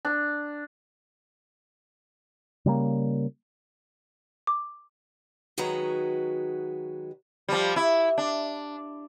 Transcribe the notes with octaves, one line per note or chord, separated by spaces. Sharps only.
D4
C#3 G3 G#3 A#3
D6
D#3 F#3 G#3 F#4 B4 A#5
F3 G3
E4
D4